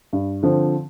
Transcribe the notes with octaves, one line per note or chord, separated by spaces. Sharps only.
G2
D3 F3 C4